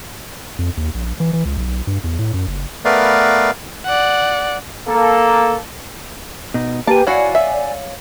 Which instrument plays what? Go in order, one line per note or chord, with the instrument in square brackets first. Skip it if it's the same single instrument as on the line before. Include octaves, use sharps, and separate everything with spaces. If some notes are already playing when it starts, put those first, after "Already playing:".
[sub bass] F2
D#2
A#1
E3
E3
C#2
B1
G2
E2
A2
F#2
F#1
[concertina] A3 B3 A#4 B4 D5 F5
[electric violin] D5 F#5
[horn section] A#3 A4
[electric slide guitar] B2 D#4
[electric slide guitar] A#3 G#5 [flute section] G4 B4 [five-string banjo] A5
[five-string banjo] E4 F#4 [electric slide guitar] C#5 F5 F#5 [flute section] D5 G#5
[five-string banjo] E5